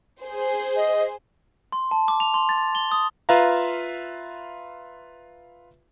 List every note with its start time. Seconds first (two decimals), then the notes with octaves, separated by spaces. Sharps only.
0.22 G#4 C5
0.76 D#5
1.72 C6
1.91 A5
2.08 D6
2.20 F7
2.34 C6
2.49 A6
2.75 G7
2.91 D#6
3.29 F4 B4 E5 F5 A#5